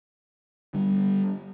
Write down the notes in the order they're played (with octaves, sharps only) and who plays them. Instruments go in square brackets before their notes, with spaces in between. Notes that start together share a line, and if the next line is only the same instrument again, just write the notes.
[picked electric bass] D3 G3 D4